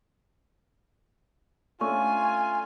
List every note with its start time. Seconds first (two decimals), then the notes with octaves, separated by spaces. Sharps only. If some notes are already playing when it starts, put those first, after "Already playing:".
1.81 A3 C#4 D4 F4 G#5 C#6